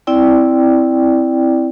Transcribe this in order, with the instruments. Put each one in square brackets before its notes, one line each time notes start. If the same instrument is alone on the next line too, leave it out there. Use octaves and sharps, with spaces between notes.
[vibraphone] C4 E4 D5 G5